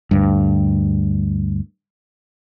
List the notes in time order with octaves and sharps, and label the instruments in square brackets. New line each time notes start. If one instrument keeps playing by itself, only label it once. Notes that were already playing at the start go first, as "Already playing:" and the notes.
[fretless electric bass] D2 G2